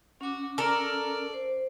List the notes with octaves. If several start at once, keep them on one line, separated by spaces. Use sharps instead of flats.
C#4 F#4 D6
A4 A#4 D5
C5